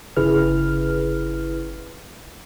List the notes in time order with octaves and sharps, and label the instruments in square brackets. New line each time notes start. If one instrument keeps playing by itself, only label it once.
[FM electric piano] G1 C#3 E4 G#4 B4 F6